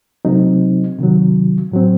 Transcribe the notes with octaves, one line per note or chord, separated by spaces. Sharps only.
C3 F#3 A3 C4 D#4
C3 D#3 F#3
A2 F#3 C4